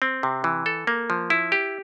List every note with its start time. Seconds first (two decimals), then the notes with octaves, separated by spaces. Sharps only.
0.02 C4
0.23 C3
0.44 E3
0.66 A4
0.87 A#3
1.10 F3
1.30 E4
1.52 G4